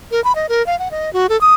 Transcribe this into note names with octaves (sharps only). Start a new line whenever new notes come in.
A#4
B5
D#5
A#4
F5
F#5
D#5
F#4
A4
D#6